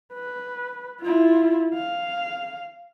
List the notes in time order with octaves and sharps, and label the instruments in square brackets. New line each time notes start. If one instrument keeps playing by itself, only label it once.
[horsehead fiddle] B4
E4 F4
F5